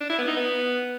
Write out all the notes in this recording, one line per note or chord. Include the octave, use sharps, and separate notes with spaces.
D4
E4
B3
D#4
B3